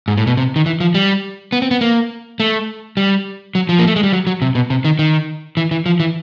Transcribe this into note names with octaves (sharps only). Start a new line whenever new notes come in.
G#2
A2
B2
C3
D#3
E3
F3
G3
B3
C4
B3
A#3
A3
G3
F#3
F3
A#3
A3
G#3
G3
F#3
F#3
C3
B2
C3
D#3
D#3
E3
E3
F3
E3